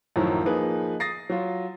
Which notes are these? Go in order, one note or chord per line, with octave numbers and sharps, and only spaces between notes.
F#2 A2 D#3 F3 F#3
F3 A#3 D#4 G#4 B4
D#6 A6 A#6 C7
F#3 F4